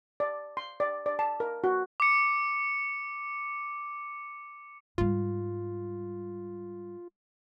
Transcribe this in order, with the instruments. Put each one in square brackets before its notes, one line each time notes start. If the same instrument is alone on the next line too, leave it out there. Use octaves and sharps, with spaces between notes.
[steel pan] D5
C6
D5
D5
A5
A#4
F#4
[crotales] D6 C#7
[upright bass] G#2 G3 [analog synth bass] F4